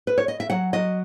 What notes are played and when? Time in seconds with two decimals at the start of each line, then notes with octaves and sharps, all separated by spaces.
0.07 B4
0.18 C#5
0.28 D#5
0.40 E5
0.50 F#3 F#5
0.73 F#3 D#5